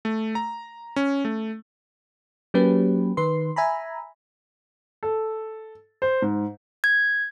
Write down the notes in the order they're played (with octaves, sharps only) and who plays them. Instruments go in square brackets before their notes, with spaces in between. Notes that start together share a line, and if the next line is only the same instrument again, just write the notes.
[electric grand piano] A3
A#5
C#4
A3
[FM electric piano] F#3 A#3 C#4 G4 B4
D#3 B4 C6
E5 G#5 A#5 B5
[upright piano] A4
C5
G#2
[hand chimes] G#6